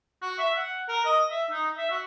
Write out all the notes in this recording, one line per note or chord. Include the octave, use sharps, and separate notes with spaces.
F#4
E5
F#5
A#4
D#5
E5
D#4
E5
F#4